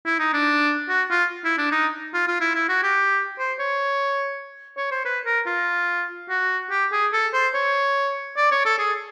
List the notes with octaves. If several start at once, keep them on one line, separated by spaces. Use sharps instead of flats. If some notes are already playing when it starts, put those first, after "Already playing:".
E4
D#4
D4
F#4
F4
E4
D4
D#4
F4
F4
E4
E4
F#4
G4
C5
C#5
C#5
C5
B4
A#4
F4
F#4
G4
G#4
A4
C5
C#5
D5
C#5
A4
G#4